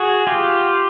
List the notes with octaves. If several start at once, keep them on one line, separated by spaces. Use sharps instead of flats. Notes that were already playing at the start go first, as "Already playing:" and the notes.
Already playing: F#4 G#4
F4 G4